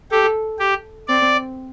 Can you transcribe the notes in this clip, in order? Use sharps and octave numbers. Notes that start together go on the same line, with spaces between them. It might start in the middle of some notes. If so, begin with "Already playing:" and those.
G4 A4
G4
C4 D5